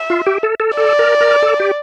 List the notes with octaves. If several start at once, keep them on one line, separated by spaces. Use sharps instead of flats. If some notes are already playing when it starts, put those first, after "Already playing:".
Already playing: E5
F4
G4
A4
A4
A4 D5
A#4
A#4
A4
G4